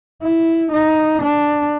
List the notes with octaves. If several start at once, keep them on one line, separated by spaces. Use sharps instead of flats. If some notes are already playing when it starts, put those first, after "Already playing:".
E4
D#4
D4